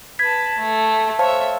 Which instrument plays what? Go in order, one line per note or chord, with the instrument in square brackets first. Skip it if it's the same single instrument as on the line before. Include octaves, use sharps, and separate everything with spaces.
[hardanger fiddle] B4 A5 [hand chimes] G#6 B6
[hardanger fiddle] A3
[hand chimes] C5 F5 A5 [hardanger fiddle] C#5 E5